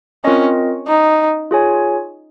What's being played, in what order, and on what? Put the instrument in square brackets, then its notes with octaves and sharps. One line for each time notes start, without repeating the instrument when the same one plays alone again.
[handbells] C4 F4 A#4 D#5 [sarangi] C#4
[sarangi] D#4
[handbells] F4 G#4 C#5 G#5